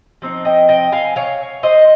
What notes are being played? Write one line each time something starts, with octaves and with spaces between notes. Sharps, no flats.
F3 C4 D#4
D#5 G5
D#5 G5
F5 G#5
C#5 F5
C5 D#5